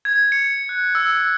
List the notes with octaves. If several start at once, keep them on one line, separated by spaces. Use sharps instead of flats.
G#6
C#7
F#6
E6